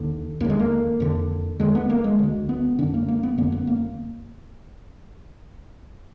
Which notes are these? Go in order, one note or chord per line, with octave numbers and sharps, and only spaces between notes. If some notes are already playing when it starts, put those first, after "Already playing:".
Already playing: D#2 D3
D#2 D3 A#3
G#3
A#3
F2 D3
D#2 D3 G#3
B3
A#3
G#3
D2 D3
B3
F#2 D3 D4
A#3
A#3
B3
F#2 D3 A#3
B3
A#3